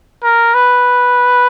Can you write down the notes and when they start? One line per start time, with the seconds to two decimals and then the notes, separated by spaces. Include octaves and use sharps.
0.23 A#4
0.54 B4